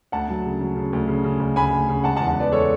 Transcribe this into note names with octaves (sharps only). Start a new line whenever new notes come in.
D2 F#5 A5
F#3
C#3
F#3
C#3
D2
C#3
C#3
D2
D2 G#5 B5
D2
C#3
G#3 F#5 A5
F#5 A5
E2
F#5 A5
E2 B4 D5
G#3 A4 C#5